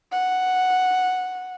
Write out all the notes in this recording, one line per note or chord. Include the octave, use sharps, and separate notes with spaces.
F#5